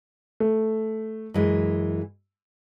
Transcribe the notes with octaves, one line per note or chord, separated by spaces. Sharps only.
A3
F#2 E3 G#3